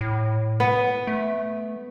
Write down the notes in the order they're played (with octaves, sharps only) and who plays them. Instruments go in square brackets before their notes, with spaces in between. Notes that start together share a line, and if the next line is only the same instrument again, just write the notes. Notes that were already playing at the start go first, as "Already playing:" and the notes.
[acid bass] A2
[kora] B3
[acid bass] A3